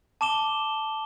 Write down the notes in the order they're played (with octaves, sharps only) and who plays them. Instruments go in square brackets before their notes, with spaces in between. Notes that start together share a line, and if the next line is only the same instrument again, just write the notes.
[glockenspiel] A5 D6 E7 G7